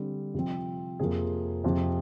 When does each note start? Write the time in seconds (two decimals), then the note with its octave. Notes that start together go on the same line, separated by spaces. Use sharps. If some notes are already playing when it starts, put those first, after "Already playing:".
Already playing: D3 G3 C4
0.34 C3 F3 C4
1.00 F2 C3 F3 A#3 G#4
1.64 F2 C3 F3